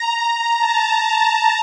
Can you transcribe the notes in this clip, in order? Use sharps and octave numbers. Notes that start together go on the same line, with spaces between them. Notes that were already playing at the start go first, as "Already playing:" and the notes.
Already playing: A#5
A#5
A5
A#5